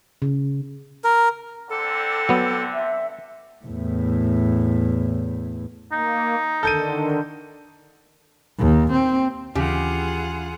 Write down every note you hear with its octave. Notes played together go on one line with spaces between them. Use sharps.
C#3
A#4
D3 G3 C4 A4
F#3 B3
E5
E2 A2
A#3 D#4
D3 D#3 A4 G6 D#7
D#2
C4
D#2 C#3 E3 F4 G4 G#4 F#5